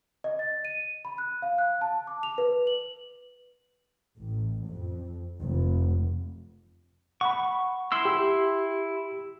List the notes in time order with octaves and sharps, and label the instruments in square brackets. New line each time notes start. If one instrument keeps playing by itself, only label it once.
[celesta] D#5
A6
D#7
B5
F#6
F5
F#6
A5
D6
F7
B4
F#7
[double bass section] A1
F2
F1
[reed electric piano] F#5 B5 [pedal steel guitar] C#6
[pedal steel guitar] E4 C6 E6
[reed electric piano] G4